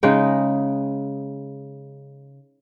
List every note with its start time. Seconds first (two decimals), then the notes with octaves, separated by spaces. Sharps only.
0.03 C#3 G#3 D#4 G5